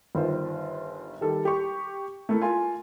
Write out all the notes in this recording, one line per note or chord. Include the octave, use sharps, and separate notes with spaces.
G1 D#3 F4 C5
D#3 G3 A4
G4 C#6
A3 E4 A4 A#4
F4 A#4 G#5